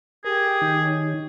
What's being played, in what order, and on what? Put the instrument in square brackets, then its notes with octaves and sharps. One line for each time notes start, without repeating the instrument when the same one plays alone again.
[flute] G4 [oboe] G#4 [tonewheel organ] A#4
[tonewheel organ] D#3 D#4
[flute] C#5